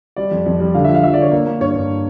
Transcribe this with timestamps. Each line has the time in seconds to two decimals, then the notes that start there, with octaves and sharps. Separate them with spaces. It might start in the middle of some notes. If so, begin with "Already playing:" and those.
0.16 G3 D5
0.31 F2
0.46 F2
0.60 G3
0.74 D3 F5
0.85 E5
0.89 F3
0.94 F5
1.03 F3 E5
1.14 D5
1.18 D3 C#5
1.31 A#3
1.47 A#3
1.60 G2 C#5
1.75 G2